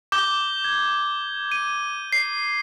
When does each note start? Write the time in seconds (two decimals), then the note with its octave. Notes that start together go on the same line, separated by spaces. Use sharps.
0.12 D6 G6 G7
0.64 G#6
1.52 D#7
2.13 C7